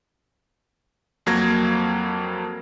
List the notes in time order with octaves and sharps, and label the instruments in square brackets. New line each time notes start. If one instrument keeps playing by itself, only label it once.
[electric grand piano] F2 F#3 A#3 G#6 A#6